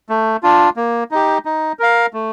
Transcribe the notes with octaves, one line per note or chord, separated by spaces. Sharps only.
A3
D4 F4
A#3
D#4 G4
D#4
A#4 F5
A3